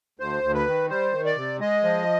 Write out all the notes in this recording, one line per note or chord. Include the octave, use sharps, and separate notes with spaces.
D2 C5
D2
B4
D#3
G3 C5
D#3
D5
C3
G#3 D#5
F3